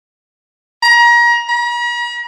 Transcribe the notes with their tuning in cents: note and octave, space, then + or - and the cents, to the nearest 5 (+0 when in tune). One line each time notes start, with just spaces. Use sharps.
A#5 +30
A#5 +45